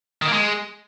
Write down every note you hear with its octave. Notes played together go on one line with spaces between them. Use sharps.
D#3
A#3
G#3